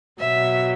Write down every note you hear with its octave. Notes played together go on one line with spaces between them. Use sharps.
B2 F#3 E5